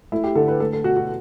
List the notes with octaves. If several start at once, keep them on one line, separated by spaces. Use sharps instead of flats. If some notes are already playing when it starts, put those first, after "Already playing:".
A3 E4
G4
D3 A4
B4
A3 A4
A4
B2 F#4
F#4